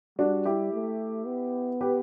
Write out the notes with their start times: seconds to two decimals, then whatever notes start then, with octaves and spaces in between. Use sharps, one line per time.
0.19 G3 D4 F#4
0.45 E4 G4
0.73 A3
1.26 B3
1.81 G4 B4